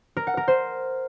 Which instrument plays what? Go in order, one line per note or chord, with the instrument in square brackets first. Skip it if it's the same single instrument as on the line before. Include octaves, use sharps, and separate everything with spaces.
[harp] A#4
F#5
A#4
C5